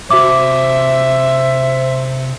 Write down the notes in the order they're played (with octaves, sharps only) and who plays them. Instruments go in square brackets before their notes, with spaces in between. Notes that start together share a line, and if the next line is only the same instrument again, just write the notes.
[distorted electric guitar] C3 A5 [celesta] F#4 D6 [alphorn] C5 [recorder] E5